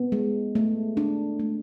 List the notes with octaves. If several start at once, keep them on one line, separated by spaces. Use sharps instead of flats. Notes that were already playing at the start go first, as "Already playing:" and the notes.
Already playing: B3
G#3
A3
D4
A3